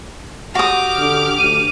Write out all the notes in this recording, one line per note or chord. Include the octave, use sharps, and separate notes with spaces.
F#4 G4 D6 D#6 F6
D3
D2 D#7